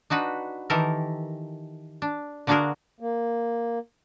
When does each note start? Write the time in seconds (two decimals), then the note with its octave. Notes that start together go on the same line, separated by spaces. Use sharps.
0.10 D4 D#4 F#4 B4
0.70 D#3 E3 G4 A4 A#4
2.02 D4
2.47 D3 A#3 D4 F#4 G#4 A#4
3.00 A#3